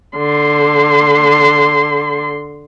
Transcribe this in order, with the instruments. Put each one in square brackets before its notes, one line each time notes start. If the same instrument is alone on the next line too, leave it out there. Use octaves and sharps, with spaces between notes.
[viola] D3 C6